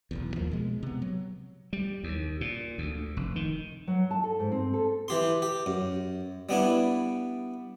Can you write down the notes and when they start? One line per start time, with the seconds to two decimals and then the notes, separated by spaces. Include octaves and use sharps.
0.11 F1 B1 E2
0.34 D#2 F3 A#3
0.51 B2 G#3
0.83 C3 B3
1.02 F#3
1.73 G3
2.04 D#2
2.41 A#2
2.78 D2
3.17 F1
3.36 D#3
3.88 F#3
4.11 A5
4.23 A4
4.40 G#2
4.52 C4
4.73 A4
5.08 E3 G4 C6
5.42 G4
5.66 F#2
6.49 G3 B3 D4 E4